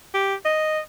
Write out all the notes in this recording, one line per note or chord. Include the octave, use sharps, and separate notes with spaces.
G4
D#5